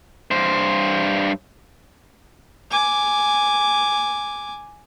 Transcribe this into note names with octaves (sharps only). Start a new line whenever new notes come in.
G2 C5
G#5 D6